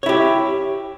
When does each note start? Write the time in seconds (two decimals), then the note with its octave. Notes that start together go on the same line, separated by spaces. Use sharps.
0.03 C#5
0.06 E4
0.09 G4